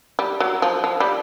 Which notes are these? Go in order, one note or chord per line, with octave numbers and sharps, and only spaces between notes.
G3
F#3
F3
F3
G3